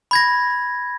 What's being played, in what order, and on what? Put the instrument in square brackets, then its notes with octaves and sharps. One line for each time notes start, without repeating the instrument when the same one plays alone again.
[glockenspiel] B5 G#6 A#6